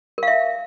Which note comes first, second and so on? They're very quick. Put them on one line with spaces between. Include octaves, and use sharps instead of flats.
A#4 F5 E5